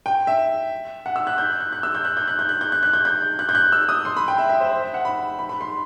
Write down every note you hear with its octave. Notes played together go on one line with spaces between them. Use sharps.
G5
E5
F#5
E6
F#6
G6
F#6
F#6
F#6
E6
G6
F#6
G6
F#6
G6
F#6
G6
F#6
F#6
G6
G6
F#6
G6
F#6
E6
D#6
C6
B5
G5
E5
E5
C5
C5
E5
F#5
B5
B5
B5
C6